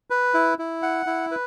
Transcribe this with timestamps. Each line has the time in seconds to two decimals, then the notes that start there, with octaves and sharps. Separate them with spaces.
0.10 B4
0.34 E4
0.59 E4
0.82 F#5
1.07 E4
1.31 B4